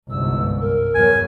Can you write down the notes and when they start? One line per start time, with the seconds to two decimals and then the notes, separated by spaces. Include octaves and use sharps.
0.10 G1 C2 G#2 E6
0.60 A#4
0.95 E2 F#3 G#5